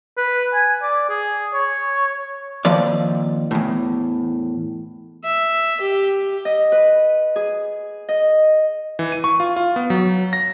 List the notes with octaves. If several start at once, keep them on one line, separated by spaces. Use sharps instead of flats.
B4
G#5
D5
G#4
C#5
D#2 F3 C4 D5
E2 A2
E5
G4
D#5
B4
G#4
D#5
E3
D#7
C#6
F4
F4
B3
F#3
A#6